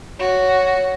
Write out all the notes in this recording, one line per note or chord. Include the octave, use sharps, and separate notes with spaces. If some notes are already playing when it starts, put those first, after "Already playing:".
F#4 C#5